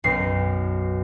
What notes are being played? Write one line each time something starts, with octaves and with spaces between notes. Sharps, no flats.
B1 F#2 C7